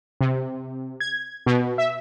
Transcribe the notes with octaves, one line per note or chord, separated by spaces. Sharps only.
C3
G#6
B2
E5